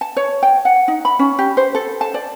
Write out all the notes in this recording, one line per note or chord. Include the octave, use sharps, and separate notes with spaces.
A5
C#5
G5
F#5
D#4
B5
C#4
G4
C5
A4
A5
D5